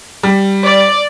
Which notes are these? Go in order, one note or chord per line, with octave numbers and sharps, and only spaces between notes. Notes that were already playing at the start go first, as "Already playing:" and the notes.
G3
D5